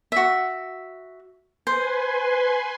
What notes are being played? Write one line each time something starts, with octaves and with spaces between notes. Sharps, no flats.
F#4 E5
B4 C5 G#5 C6